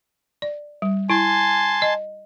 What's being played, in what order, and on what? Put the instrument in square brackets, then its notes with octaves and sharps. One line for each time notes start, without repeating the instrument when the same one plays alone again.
[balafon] D5
G3
[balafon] E4 [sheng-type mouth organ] G#5 A5 C6
[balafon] D#5